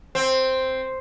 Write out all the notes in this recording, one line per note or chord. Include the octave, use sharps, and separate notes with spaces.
C4